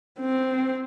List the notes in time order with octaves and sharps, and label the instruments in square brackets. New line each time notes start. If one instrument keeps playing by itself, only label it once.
[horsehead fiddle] C4